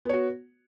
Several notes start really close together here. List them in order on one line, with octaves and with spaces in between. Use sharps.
B3 C#5 F#4